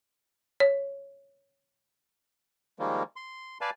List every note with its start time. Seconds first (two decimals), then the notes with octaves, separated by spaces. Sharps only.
0.60 C#5
2.79 D#3 F3 G3 G#3 A#3
3.16 C6
3.61 B4 D5 F5 G#5 A5